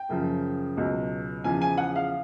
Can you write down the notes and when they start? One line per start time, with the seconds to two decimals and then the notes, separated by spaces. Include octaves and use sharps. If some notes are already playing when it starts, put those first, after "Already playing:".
Already playing: G5
0.09 F#2 C#3 F3
0.77 C#2 B2 F#3
1.44 E2 C#3 F3 G#5
1.61 G#5
1.77 F#5
1.96 F5